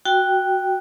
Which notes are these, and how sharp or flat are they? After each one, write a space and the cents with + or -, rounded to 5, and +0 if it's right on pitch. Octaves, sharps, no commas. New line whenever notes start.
F#4 +0 G5 +0